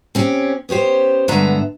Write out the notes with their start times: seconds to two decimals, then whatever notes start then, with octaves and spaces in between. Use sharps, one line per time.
0.15 C4 C#4 G4
0.69 B3 C#4 G4 C5
1.28 G2 D3 G#3 B3 E5 A#5